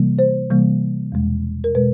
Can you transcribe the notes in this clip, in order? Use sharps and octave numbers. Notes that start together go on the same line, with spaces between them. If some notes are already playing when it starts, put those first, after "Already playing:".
Already playing: C3 E3 G3 A#3
C5
C3 E3 G3 A#3
E2 B2 G#3
A#4
B2 G#3 B4